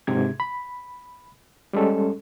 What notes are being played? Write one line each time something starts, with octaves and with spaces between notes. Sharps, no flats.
G#2 C3 G#6
B5
G3 G#3 C#4 A4